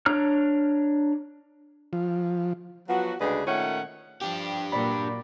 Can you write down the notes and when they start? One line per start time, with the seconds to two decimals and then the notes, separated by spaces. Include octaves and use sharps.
0.06 D4 C#5 A#5 F6
1.93 F3
2.89 F3 F#3 B3 F#4
3.21 D2 C#3 G#3 D4 G#4 B4
3.47 A#2 D#3 A3 C#4 C#5 F#5
4.21 F3 D4 G4
4.72 A#2 F#3 D5 B5